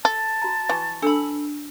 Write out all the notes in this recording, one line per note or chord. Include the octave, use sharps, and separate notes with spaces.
A4 A5
F#4 A#5
E3 C#6
D4 A4 B5 E6